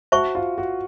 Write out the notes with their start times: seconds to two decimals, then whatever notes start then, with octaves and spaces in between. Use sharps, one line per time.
0.12 F#4 C5 E5 A5 C#6
0.35 F4
0.58 F#4